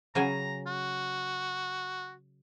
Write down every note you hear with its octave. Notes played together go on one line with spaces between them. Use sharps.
C#3 F#3 G#5 A#5
F#4